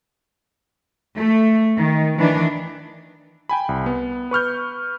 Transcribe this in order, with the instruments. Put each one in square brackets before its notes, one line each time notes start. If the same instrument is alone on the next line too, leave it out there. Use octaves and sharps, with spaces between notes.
[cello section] A3
D#3
D#3 E3 D4
[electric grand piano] G5 G#5 B5
C2
B3
B4 C#6 F6 G6